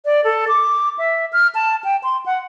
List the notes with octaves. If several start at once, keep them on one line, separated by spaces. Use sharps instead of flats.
D5
A4
D6
E5
F6
A5
G5
C6
F#5